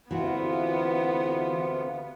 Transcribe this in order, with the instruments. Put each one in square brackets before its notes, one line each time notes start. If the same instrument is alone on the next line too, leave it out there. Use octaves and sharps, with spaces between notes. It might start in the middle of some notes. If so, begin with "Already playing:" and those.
[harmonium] D2 C3 F4 [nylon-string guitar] E3 F#4 [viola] B3 [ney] F#5